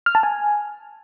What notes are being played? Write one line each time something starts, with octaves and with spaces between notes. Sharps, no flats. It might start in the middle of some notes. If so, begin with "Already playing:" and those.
F6
A5
G#5